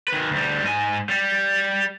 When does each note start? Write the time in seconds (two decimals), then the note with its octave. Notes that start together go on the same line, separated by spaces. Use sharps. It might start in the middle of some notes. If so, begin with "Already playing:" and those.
0.08 D#3 B4
0.31 D2 G3
0.64 G#2 G#5
1.09 G3